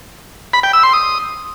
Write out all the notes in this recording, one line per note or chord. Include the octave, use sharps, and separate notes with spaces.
B5
G5
E6
C6
D#6